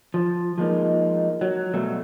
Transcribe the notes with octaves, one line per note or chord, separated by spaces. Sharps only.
F3
F3 G#3 A#3 D#4
F#3
B2 F#3 G3 A3 F#4